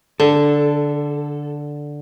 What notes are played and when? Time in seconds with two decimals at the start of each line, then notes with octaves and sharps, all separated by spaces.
0.20 D3 A4